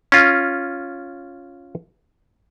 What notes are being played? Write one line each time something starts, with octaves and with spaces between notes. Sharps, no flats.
C#4 F4